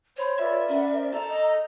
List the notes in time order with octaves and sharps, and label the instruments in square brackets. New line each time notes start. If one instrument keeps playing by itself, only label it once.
[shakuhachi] C5 [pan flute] C#5 [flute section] B5 C6
[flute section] F4 A4 B4 [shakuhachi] D5 [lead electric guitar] E5
[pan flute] C#4 [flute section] A#4 F#5 B5
[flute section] A#4 C5
[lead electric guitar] A4 [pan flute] A#5 [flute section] G6
[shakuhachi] D#5